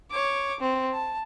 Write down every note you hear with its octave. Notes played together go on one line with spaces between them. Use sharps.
C#5 D6
C4
A5